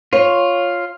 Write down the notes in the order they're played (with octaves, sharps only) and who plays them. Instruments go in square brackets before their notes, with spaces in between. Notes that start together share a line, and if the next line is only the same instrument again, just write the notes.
[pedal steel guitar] F4 [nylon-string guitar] C#5